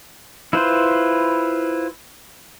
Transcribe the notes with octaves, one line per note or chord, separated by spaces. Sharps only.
E4 F4 B4 C5